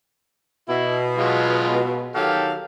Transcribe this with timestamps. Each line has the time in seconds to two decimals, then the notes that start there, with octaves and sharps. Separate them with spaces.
0.68 B2 E4
1.18 F#3 G#3 F4
2.15 D#3 F#3 G4 A4 F5